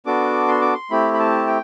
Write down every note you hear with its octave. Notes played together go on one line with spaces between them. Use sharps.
B3 D4 F#4 A4 D6
C6
D6
C6
A3 C4 E4 G4 B5
B5
A5
G5